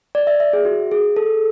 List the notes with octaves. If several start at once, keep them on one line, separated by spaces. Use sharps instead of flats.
D5
E5
E5
G#4
F#4
G#4
A4